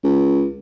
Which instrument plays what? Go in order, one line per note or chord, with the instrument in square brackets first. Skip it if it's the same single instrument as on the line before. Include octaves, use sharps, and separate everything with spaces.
[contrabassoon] C#2